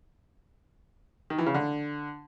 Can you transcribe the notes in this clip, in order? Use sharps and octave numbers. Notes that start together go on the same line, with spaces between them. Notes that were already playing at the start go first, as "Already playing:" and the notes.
D#3
E3
C#3
D3